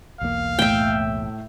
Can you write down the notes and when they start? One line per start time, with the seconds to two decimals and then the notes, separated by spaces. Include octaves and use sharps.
0.21 B1 E2 A#3 F5
0.59 A2 E5 G5